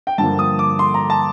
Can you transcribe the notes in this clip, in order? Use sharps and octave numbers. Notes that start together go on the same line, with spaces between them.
G5
G2 D3 F3 A#3 A5
D#6
D6
C6
A#5
A5